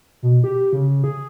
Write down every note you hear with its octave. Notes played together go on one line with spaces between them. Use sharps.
B2
G4
C#3
G#4